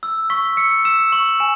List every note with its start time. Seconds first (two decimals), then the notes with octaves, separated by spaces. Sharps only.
0.03 E6
0.30 C#6 B6
0.57 E6 C#7
0.85 E6 E7
1.12 C#6 F#7
1.40 G#5 E7